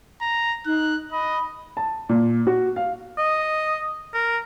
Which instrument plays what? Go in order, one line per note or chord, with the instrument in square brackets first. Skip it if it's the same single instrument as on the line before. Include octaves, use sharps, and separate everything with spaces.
[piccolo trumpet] A#5
[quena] D#4 [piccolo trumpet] F#6
[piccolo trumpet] D#5 [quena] B5
[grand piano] A5
A#2
F#4
F5
[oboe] D#5
A#4